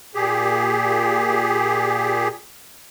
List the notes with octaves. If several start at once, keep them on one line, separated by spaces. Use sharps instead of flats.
A#2 G4 G#4